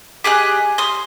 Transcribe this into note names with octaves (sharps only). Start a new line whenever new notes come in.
G4 G#4 D#5 F#6
C6 D#6